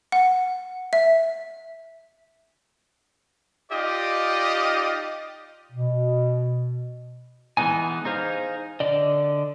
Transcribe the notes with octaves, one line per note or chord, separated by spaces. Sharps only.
F#5
E5
D#4 F4 G4 D5 D#5
B2
E3 G#3 B3 D#4 G#5
D#4 G#4 C5 F5
D3 D5 D#5